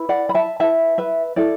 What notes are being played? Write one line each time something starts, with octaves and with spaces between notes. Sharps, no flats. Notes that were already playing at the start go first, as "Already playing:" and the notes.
Already playing: E4 B4
D5 F#5
B5
E5 A5
E4 B4 E5 A5
B4 E5
E4 A4 D5